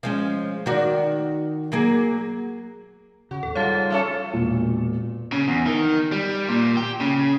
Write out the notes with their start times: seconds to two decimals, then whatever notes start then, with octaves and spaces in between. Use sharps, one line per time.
0.03 F3 G#3 C#4
0.66 D#3 F#4 D5
1.72 F#3 A#3 G#4
3.31 C#3 F#4
3.43 D#2 A2 A4
3.55 G#2 G3 F4 C#5 F5 A5
3.90 A3 C#4 A4
4.33 E1 A#2
5.32 C#3
5.48 E2
5.67 D#3
6.12 G3
6.48 A#2
6.77 G4
7.01 C#3